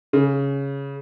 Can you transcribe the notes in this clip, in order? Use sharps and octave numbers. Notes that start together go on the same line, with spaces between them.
C#3